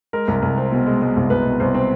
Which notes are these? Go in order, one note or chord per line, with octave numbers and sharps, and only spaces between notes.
G#3 A#4
C2
C2
C4
B2
G#3
G#3
C2
C2 B4
B2
C2 C5
C4